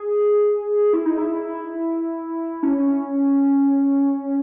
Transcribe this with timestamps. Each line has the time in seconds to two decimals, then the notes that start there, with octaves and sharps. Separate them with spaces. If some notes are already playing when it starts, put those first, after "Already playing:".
Already playing: G#4
0.93 E4
1.06 D#4
1.18 E4
2.63 C#4